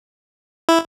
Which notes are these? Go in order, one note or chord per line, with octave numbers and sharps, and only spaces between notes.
E4